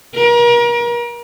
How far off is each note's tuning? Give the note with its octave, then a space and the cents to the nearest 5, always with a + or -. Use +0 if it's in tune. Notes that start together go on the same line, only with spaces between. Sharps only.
A#4 +35